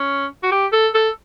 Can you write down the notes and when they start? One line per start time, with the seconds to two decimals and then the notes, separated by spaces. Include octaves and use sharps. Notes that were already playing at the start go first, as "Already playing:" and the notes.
Already playing: C#4
0.43 F#4
0.52 G4
0.73 A4
0.94 A4